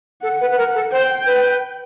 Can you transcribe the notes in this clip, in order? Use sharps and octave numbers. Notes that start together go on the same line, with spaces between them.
A4 F#5
B4
B4
A#4
A4
C5 G5
B4